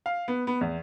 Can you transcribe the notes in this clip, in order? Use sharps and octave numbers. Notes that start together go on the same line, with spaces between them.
F5
B3
B3
E2